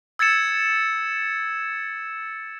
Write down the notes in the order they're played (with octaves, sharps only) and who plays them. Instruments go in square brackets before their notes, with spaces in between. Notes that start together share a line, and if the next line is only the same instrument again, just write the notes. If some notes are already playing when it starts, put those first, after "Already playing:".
[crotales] E6 G#6 A6 C#7 E7